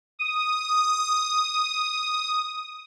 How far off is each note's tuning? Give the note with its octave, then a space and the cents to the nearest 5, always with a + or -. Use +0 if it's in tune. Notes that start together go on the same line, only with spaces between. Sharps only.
D#6 +0